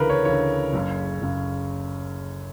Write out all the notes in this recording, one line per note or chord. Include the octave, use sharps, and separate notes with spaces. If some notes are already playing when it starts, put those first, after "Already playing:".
Already playing: D2 C#3 E3 A#4 B4
C#5
D2 C#3 E3 C#5
F#1 F#2 C#3
F#1 F#2 C#3